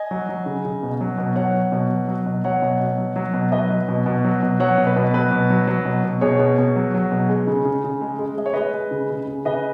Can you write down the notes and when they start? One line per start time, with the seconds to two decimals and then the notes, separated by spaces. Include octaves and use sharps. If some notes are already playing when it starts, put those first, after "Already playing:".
Already playing: D#5 G#5
0.11 F#3
0.29 F#3
0.46 C#3
0.65 C#3
0.83 B2
1.01 F#3
1.18 B2
1.36 F#3 C#5 F#5
1.54 F#3
1.72 B2
1.90 F#3
2.08 F#3
2.26 B2
2.44 F#3 C#5 F#5
2.62 B2
2.80 B2
2.98 F#3
3.16 F#3
3.34 B2
3.52 F#3 B4 D#5
3.70 F#3
3.89 B2
4.06 B2
4.24 F#3
4.43 B2
4.60 F#3 C#5 F#5
4.78 B2
4.87 B4
4.96 B2
5.14 F#3 B4
5.31 B2
5.50 F#3
5.67 F#3
5.85 B2
6.03 B2
6.21 B2 G#4 C#5
6.39 B2
6.58 B2
6.76 F#3
6.94 F#3
7.12 B2
7.29 G#3
7.47 C#3
7.65 C#3
7.84 C#3
8.01 G#3
8.19 G#3
8.38 G#3 D#5
8.46 C#5
8.54 G#3 B4 D#5
8.74 G#3
8.91 C#3
9.10 C#3
9.27 C#3
9.45 C#3 B4 D#5